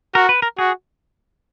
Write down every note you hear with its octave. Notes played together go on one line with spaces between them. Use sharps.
F#4 A#4
B4
A#4
F#4 G#4